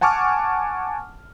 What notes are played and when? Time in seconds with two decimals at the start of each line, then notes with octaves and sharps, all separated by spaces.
0.01 F#5 G#5 A5 C#6 D6 F6